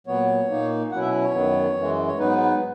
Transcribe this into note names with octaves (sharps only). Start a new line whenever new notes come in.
A#2 F#3 B3 C#5
A#2 A#3 D#4
B2 F#3 C#4 E4 F#5
E5
C#5
F#2 D#3 F#3 B3
F#2 E3 G#3
C#5
G#2 F#3 B3 D#4 B4
B4